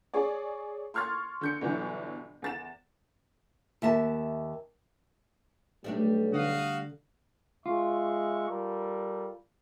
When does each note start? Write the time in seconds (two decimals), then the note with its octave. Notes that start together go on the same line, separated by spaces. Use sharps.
0.14 G#4 C#5 D5
0.94 C6 C#6 F6 G#6 A6
1.41 D3 G6 C#7
1.61 G1 B2 D3 E3 F#3
2.42 E2 A6 E7
3.82 D#2 E5 A5
5.84 B1 G3 A3 D4
6.32 D3 F#4 F5 D#6
7.66 G#3 F4 E5 C#6
8.48 G3 A4 A#4